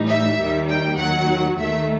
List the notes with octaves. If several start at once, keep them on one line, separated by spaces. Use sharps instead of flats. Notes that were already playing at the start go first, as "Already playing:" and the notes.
Already playing: A2 E3 G3 D#4
E5
D#2 D#3 G3
G5
D#2 D#3 F#3 F#5
D#2 D#3 A3 E5